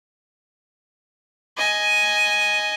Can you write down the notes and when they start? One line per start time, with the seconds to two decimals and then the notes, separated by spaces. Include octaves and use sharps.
1.58 D#5 G#5